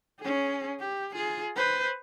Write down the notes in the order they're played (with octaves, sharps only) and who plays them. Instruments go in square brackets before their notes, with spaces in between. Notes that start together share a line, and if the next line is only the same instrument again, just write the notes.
[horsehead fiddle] C#4 G#4
G4
F4 G#4
B4 C5